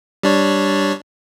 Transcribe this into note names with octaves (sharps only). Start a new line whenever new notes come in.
G3 D4 C#5